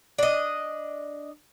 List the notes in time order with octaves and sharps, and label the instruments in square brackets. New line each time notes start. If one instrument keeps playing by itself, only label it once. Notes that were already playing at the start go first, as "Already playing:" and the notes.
[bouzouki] D4 D#5